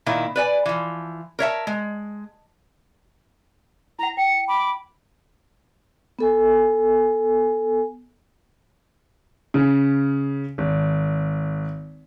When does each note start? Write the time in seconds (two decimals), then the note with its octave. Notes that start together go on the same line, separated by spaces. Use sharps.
0.06 A#2 D#3 E4
0.36 B4 D5 G#5
0.66 E3 F3
1.39 A#4 C#5 E5 A5
1.67 G#3
3.99 E4 F#5 A#5
4.17 G5 C#7
4.48 B5 D6
6.19 B3 A4 G#5
9.54 C#3
10.58 G#1